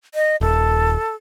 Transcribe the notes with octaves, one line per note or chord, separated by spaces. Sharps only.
D#5
D#1 A4